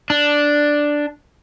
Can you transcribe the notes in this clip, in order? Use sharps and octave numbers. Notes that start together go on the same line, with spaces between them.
D4